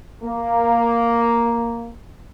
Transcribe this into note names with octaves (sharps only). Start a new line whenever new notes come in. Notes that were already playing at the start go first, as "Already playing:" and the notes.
A#3